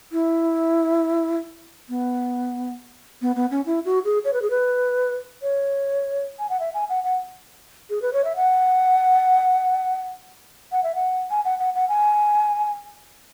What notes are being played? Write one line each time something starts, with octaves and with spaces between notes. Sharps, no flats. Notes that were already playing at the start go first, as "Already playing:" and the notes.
E4
B3
B3
B3
C#4
E4
F#4
G#4
C#5
B4
G#4
B4
C#5
G#5
F#5
E5
G#5
F#5
F#5
G#4
B4
C#5
E5
F#5
F#5
E5
F#5
G#5
F#5
F#5
F#5
G#5